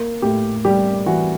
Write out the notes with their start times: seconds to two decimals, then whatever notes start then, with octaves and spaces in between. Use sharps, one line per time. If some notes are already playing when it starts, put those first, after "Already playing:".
Already playing: A#3
0.22 A2 G4
0.65 G3 G4
1.06 E3 F#4